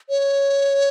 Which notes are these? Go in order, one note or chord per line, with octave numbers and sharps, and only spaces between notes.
C#5